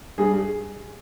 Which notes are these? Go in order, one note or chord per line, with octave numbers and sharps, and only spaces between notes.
G2 G#4